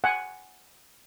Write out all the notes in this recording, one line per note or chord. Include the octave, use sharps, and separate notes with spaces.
F#5 G#5